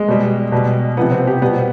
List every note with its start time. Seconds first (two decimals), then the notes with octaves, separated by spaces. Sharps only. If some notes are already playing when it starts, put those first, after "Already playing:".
Already playing: G#3
0.08 B2 G3
0.52 B2 G3
0.97 C3 F3 B3
1.12 C4
1.27 G4
1.42 B2 G3 B3